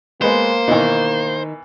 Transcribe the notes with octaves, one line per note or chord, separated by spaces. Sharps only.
G#3 A#3 B3 C5
B2 D#3 E3 D#4